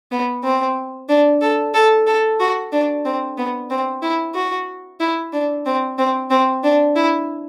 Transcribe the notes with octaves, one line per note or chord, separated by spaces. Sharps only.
B3
C4
D4
A4
A4
A4
F#4
D4
C4
B3
C4
E4
F#4
E4
D4
C4
C4
C4
D4
E4